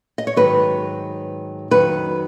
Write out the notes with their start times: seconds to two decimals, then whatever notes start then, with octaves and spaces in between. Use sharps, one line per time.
0.18 D#5
0.27 C#5
0.36 G#2 D#3 F#3 B4
1.71 F2 D#3 F#3 B4